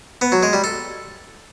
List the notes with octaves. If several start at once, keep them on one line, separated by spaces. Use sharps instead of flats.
B3
F#3
G#3
G3
A4